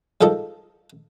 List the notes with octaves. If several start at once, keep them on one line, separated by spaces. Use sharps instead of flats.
G#2 F3 A4 A#4 D#5